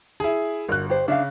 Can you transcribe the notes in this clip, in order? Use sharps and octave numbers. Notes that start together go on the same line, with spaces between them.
E4 G#4
G1 F#4 A#4 F#6
G4 C5
C#3 D4 E5 F5